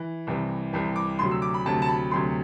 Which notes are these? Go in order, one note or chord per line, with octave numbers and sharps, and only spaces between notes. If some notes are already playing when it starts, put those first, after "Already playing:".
Already playing: E3
C2 C3 E3
C2 C3 E3
D6
D2 C3 F#3 C6
E6
D6
B5
D2 C3 F#3 A5
A5
B5
D2 C3 F#3 C6